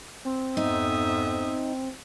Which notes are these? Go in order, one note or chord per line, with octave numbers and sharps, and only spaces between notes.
C4
F2 G#2 B3 D#4 E5 D#6